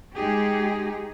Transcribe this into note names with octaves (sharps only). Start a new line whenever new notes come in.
G#3 D#4 G4 G#4